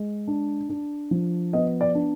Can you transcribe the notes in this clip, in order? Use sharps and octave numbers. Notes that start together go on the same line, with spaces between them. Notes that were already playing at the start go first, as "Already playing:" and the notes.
Already playing: G#3
D4
D4
F3
B3 D#5
D5
D4